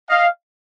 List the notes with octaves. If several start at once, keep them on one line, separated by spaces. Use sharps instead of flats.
D#5 F5